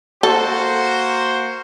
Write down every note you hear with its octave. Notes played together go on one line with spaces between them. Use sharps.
A#3 F#4 A4 C5